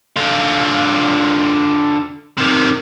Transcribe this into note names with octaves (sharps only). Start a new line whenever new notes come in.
D3 F4
C3 D#3